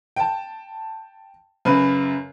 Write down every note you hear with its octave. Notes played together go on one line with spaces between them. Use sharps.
G5 A5
F#2 C#3 B4